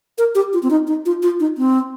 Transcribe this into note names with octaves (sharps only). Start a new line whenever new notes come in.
A#4
G4
F4
C4
D#4
D#4
F4
F4
D#4
C4